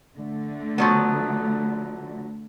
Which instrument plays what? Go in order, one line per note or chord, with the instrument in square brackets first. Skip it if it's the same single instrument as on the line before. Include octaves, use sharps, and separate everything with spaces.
[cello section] D3 A3
[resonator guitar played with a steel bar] F3 F#3 B3